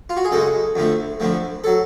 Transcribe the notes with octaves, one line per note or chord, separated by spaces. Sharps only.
F4
F#4
G#4
F#2 C#3 G#3 A4
F2 D3 F3 A3
F2 D3 F3 A3
F#3 A4